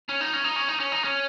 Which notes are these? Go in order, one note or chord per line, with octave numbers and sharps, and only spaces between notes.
C#4
D#4
C#4
D#4
C#4
D#4
C#4
D#4
C#4